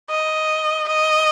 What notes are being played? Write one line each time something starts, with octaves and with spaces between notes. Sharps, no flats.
D#5
D#5